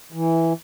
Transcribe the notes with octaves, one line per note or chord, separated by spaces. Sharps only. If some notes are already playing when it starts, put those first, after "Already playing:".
E3